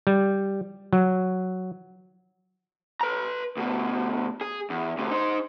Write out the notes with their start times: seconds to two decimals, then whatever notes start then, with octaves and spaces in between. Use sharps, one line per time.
0.07 G3
0.93 F#3
3.01 B4 A#5
3.57 D2 B2
4.41 G#4
4.70 E2
4.98 D2 C3
5.11 D#4 C5